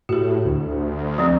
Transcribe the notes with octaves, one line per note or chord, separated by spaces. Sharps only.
A2 F#4 G4
D2
F3 C4